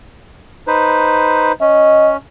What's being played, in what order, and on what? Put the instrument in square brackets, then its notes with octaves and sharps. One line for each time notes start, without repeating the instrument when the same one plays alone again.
[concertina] D#4 B4 C5
[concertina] C#4 [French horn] D#5